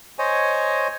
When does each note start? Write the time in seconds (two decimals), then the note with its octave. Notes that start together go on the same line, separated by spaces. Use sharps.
0.19 C5 C#5 D#5 G#5